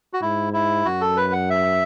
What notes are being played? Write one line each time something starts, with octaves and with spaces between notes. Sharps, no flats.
F#4
G#2 E4
E4
F#2 F#4
A4
B4
F#5
E5